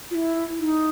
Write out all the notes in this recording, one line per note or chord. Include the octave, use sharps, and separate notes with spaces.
F4
E4
D#4